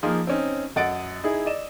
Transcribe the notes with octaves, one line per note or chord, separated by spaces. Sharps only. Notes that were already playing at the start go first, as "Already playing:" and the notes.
F3 A#3 D#4 F4 G#4
C4 C#4 D#4
F#2 D#5 F#5 A6 D7
D#4 E4 G#4
D5 D#5 E7